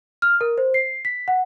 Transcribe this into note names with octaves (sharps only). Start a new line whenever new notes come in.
F6
A#4
C5
C7
B6
F#5